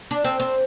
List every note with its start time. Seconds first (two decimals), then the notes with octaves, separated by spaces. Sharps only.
0.11 D4
0.25 C4
0.40 C4